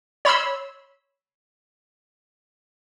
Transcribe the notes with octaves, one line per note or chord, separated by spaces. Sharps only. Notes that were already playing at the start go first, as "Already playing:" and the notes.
C#5 B5 C6 E6